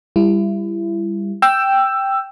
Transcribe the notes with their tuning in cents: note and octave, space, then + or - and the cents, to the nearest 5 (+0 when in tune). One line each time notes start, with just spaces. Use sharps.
G3 +20 E4 +30
G5 +0 E6 +15